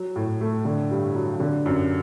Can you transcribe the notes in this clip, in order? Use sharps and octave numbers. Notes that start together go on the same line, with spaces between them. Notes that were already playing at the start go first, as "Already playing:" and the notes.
Already playing: F#3
A2
A3
D3
G2
F#3
D3
F#2